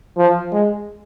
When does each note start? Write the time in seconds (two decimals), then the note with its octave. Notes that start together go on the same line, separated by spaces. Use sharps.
0.17 F3
0.52 G#3